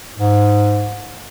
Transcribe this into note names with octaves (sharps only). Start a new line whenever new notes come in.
G#2